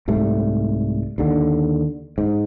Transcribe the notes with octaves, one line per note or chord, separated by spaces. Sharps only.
C2 G#2 G3 A3
D#2 D3
G#2